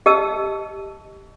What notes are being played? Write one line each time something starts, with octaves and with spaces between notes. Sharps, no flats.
G4 D#5 A5 E6